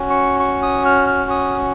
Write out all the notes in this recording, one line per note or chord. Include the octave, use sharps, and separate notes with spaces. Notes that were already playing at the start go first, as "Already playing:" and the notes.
Already playing: C#4 F#4
C#6
C#6
D#6
F6
F6
D#6